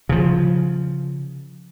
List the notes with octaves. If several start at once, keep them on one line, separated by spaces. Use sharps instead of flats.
C#3 F3